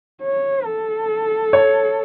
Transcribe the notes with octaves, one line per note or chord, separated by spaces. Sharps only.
C#5
A4
C#5